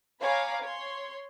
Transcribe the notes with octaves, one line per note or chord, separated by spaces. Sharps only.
C#5 F5 G#5 A#5 B5 D6
C#5 C6